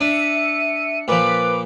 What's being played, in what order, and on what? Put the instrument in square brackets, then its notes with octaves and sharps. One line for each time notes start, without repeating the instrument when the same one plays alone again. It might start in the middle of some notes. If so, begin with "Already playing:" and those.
[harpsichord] D4 [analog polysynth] E5 C#7 [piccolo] D#7
[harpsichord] A#2 F3 [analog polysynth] B4 [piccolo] D6